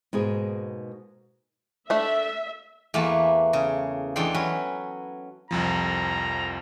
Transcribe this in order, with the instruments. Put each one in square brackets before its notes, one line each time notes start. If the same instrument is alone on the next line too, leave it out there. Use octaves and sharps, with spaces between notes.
[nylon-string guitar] G#2 B2 A#3 G#4
[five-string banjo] A3 D4 [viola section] E5
[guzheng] E2 A3 A#3 B4 A5
C#3
E2 G#3 D4 A4 G5 C6
F#3 C#4 B4
[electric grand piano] C2 F2 F3 [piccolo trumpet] A#5